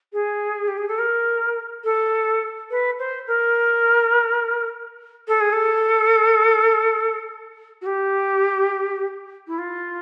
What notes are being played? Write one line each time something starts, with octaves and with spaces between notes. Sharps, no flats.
G#4
G4
G#4
A4
A#4
A4
B4
C5
A#4
A4
G#4
A4
F#4
G4
E4
F4